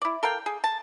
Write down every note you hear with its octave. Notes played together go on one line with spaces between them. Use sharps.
E4 D5
A4 A#4 F5 G5
G#4
A5